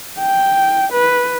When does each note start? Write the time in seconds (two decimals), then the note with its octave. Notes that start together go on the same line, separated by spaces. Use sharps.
0.20 G5
0.92 B4